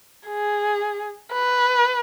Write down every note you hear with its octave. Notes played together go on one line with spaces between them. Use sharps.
G#4
B4